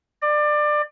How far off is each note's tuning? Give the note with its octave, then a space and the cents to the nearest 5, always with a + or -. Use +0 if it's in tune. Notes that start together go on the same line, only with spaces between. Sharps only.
D5 +25